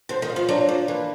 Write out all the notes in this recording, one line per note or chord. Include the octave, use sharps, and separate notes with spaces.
D3 C5
D#3
F5
F3
F#3 D4
F3 F5
E3 A#3